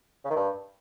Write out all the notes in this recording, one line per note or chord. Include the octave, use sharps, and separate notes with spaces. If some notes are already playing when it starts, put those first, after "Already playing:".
C#3
D#3
G2